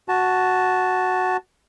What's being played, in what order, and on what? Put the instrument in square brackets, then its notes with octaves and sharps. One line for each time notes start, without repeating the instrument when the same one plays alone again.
[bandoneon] F#4 A5